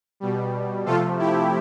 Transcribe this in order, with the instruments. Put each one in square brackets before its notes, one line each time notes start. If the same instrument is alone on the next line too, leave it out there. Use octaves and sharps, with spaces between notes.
[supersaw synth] B2 G3
C3 F3 A3 F4 A4
E4 G4